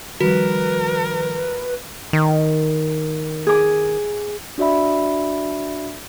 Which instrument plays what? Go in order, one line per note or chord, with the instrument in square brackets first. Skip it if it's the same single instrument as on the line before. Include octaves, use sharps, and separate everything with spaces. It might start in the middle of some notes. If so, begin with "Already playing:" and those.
[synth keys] D#3 F3 G3 [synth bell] F#4 [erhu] A#4 [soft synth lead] B4
[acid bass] D#3
[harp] G#4 D6
[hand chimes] D4 F#4 D5 E5 B5